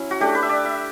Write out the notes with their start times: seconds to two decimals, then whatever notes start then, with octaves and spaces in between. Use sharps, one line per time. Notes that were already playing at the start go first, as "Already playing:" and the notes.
Already playing: F#3 C#4 E4
0.11 F#4
0.20 A3 D4 G4
0.35 B4
0.43 E5
0.49 D5
0.65 E5